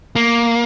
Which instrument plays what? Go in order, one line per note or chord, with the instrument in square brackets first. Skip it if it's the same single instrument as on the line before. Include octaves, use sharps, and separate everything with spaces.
[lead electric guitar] A#3